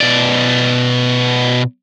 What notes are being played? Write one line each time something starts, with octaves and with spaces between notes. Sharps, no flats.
B2 D5